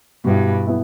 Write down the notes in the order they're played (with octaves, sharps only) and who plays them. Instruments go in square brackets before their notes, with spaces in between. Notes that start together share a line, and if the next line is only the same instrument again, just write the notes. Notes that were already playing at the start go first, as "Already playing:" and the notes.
[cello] G2 [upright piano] B2 G3 B3 E4
[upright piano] B3 E4